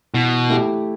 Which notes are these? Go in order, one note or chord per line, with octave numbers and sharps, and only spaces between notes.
B2 E3
A3 E4 G4